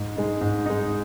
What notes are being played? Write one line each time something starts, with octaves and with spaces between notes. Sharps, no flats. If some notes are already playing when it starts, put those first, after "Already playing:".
Already playing: G#2
G#3 D#4
G#2
G#3 D#4